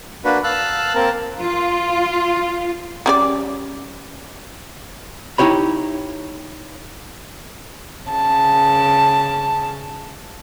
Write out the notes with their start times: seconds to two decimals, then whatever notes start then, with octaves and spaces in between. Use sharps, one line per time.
0.25 A#3 D4 F#4 B4
0.44 F5 A5 E6 F#6
0.95 A#3 C4 A#4 A5
1.41 F4
3.06 G3 C#4 D5
5.38 D#4 E4 G4 C#5 B5
8.09 C#3 A5